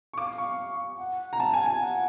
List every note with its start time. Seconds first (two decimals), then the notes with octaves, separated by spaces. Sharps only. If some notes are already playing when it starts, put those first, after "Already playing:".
0.13 C#6
0.18 F5 D6
0.38 C#6
0.99 F#5
1.33 A#5
1.40 A5
1.53 G#5
1.66 G#5
1.81 F#5